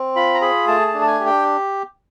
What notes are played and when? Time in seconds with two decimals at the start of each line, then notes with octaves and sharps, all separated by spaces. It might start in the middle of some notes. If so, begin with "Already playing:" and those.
Already playing: C4
0.16 F4 B5
0.34 A#5
0.41 G#4 B5
0.67 A3 A5
0.87 A5
0.94 D4
1.01 A5
1.07 G#5
1.20 G4
1.26 G5